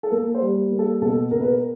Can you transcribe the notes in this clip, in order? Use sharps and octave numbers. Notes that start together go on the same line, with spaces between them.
A4
A#3 A#4
C5
G3
A#3
A4
B2 A4
B2 A#4
B4
A#4